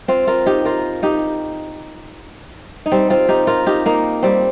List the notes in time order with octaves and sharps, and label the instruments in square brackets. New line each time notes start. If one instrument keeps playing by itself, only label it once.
[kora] C4 F4
F4 A#4
D#4 G4
F4 A#4
D#4 G4
D#4
G3 C4
C4 F4
D#4 G4
F4 A#4
D#4 G4
A#3 D#4
G3 C4